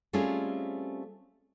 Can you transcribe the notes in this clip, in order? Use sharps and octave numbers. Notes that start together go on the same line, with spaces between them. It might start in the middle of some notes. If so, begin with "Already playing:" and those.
G3 A3 C4 C#4 F4 G#4